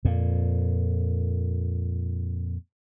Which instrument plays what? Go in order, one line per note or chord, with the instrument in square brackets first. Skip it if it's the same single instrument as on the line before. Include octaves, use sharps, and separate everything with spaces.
[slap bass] F2 A#2